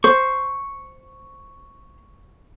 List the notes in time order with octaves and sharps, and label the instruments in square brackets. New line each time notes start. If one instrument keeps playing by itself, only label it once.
[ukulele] C5 [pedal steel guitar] C#6